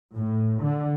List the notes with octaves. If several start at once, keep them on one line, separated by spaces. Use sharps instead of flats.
A2
D3